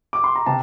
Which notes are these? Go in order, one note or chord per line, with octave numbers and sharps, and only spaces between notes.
D6
C6
A#5
C3 A5